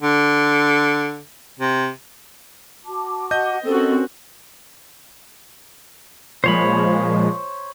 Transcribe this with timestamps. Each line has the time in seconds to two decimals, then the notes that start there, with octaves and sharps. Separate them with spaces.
0.02 D3
1.59 C3
2.86 F#4 A5 D6
3.31 D#5 F#5 G6
3.65 C4 C#4 F#4 A4 A#4
6.44 A#2 F3 G#3 C5 C#5 B5